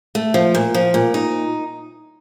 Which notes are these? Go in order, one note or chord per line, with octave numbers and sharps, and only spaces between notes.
A3
F3
A#2
F3
A#2
D#4